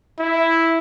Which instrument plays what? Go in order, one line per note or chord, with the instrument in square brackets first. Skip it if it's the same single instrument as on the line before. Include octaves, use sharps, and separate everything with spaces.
[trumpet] E4